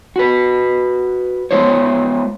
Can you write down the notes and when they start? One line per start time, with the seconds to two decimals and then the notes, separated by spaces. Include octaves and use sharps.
0.16 F#4 B4
1.51 G#3 B3 F4 C5 C#5